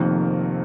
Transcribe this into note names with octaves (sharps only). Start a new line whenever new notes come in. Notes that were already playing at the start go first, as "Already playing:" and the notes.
Already playing: F1 F2 D#3 A#3